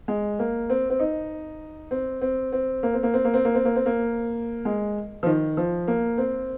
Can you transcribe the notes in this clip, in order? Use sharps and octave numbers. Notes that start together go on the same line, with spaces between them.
G#3
A#3
C4
C4
D#4
C4
C4
C4
A#3
C4
A#3
C4
A#3
C4
A#3
C4
A#3
C4
A#3
G#3
F3
D#3
F3
A#3
C4